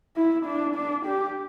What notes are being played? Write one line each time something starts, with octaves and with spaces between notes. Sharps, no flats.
E4
D4
D4
G4